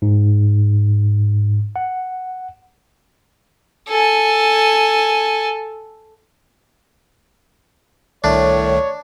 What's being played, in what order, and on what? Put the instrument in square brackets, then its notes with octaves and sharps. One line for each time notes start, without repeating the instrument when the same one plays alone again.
[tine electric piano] G#2
F#5
[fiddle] A4 G#5
[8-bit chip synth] C2 D#3 A3 [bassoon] A2 [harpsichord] D4 [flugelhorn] C#5